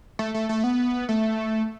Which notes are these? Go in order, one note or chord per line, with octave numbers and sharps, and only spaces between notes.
A3
A3
A3
B3
A3